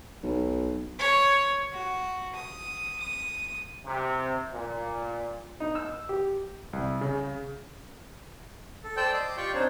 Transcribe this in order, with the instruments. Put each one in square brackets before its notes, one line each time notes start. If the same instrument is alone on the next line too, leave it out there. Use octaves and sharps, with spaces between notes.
[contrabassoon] B1
[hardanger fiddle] C#5
F#4
D#6
D#6
[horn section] C3
A#2
[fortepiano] D#4
E6
G4
[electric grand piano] C2
C#3
[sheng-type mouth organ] A4
C5 D5 G5 A5 E6 G6
D#5 C6 D6
F4 G4 D5 G5 C#6 G6
C4 D4 D#4 C5 C#5